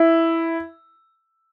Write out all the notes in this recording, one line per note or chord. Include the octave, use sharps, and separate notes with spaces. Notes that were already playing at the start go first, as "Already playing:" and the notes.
Already playing: E4